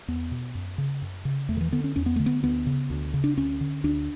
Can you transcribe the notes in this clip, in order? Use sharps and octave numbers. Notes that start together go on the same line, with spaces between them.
E2 B3
B2
F#2
C#3
F#2
C#3
E2 A3
D3
E3
D3 B3
C#4
E2 C#4
B3
D3 A3
B3
D2 B3
C#3
D2
C#3
D4
D2 C#4
D3
D2 D4